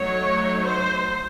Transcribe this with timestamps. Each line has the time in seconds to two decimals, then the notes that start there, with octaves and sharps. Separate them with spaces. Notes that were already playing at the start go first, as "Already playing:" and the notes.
Already playing: F#3 A3 D#4 C#5
0.65 C5